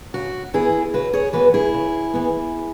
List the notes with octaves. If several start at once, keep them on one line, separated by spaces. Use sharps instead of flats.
C#3 F#4
E3 B3 E4 G#4
C#3 F#4 B4
G#4 C#5
E3 B3 F#4 B4
E4 G#4
C#3
E3 B3